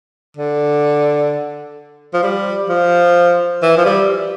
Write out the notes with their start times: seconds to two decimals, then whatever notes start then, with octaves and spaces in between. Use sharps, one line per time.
0.37 D3
2.14 F3
2.23 G3
2.69 F3
3.62 E3
3.77 F3
3.85 G3